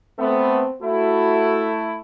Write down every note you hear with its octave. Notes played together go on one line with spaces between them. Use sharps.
A3 B3 C4
A3 E4 F#4